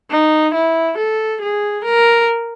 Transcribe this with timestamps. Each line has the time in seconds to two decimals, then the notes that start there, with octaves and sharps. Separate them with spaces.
0.11 D#4
0.54 E4
0.98 A4
1.42 G#4
1.85 A#4